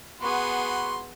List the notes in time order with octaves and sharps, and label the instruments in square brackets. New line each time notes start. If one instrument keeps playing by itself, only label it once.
[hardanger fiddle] B3 G#4 [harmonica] F#4 B5 C6